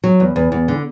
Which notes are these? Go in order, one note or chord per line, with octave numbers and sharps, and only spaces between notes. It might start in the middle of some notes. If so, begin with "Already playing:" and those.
F#3
E2
E2
E2
D3